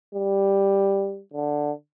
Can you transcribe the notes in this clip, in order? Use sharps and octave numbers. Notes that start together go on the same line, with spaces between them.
G3
D3